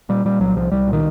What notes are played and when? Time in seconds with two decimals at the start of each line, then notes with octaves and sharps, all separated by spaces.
0.09 A#2 G3
0.25 A#2 G3
0.40 C2 F#3
0.56 C2 F3
0.72 C2 G3
0.88 A#2
0.93 D#3